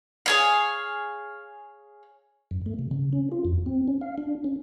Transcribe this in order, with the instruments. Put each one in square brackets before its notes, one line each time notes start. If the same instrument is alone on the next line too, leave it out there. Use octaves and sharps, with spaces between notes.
[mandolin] G#4 C#5 F5
[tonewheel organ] F#2
A3
C3
C#3
C#4
F4
F2
C4
C#4
F5
D4
C#4